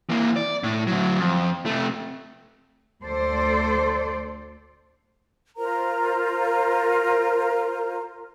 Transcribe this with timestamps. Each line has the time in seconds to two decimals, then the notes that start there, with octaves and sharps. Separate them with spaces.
0.10 E3 A#3
0.36 D5
0.63 A2
0.87 D2 F#3
1.20 F2
1.66 C3 A3
3.03 D2 A4 C5 D5
5.57 F4 A#4 C5 A#5